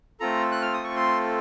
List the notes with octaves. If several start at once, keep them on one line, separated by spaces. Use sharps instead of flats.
A3 C4 F4 A4 A#5
F#6
F6
D#6
C#6
C6